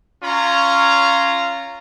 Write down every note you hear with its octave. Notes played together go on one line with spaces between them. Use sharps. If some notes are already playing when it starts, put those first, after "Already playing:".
C#4 F4 C#5 F5 A#5